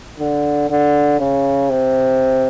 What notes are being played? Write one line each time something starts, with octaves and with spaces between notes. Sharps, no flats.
D3
D3
C#3
C3